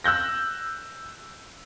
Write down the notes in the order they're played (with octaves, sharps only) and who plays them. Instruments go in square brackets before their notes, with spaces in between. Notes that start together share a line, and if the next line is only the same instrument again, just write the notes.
[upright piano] E6 F#6 G6 A#6